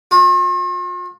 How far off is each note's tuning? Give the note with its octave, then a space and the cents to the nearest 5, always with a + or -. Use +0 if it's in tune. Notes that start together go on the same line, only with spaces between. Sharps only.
F4 +45